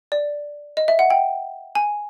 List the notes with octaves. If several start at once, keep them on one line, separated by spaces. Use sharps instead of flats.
D5
D#5
E5
F#5
G5
G#5